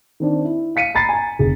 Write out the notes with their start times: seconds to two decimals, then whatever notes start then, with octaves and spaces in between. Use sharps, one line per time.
0.20 D#3 C4 D4
0.45 E4
0.76 F5 B6 C#7 D#7
0.95 A#5 B5 A6 B6 C7
1.09 G#5 A#5
1.39 F1 G#4